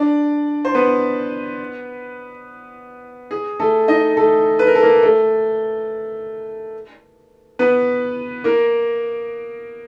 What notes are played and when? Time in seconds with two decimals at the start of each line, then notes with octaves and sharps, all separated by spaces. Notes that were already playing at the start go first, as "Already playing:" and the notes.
Already playing: D4 D5
0.65 C5
0.75 B3 B4
3.31 G#4
3.60 A3 A4
3.88 D#4 D#5
4.17 A3 A4
4.59 B4
4.67 A#4
4.75 A4
4.83 A#3 A#4
5.03 A3 A4
7.59 B3 B4
8.44 A#3 A#4